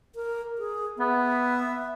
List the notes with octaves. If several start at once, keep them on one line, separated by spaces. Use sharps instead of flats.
A#4
G#4
B3 E5